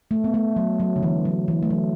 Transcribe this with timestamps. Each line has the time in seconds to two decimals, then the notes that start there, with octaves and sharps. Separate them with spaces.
0.11 A3
0.24 B3
0.34 A3
0.56 F#3
0.80 F#3
0.96 D3
1.03 E3
1.25 F#3
1.48 E3
1.63 A3
1.70 F#3